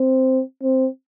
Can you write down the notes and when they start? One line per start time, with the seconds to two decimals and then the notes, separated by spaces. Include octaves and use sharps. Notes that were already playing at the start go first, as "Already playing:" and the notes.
Already playing: C4
0.63 C4